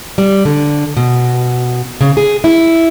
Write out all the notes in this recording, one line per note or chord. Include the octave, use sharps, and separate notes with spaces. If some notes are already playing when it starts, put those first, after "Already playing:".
G3
D3
B2
C#3
G#4
E4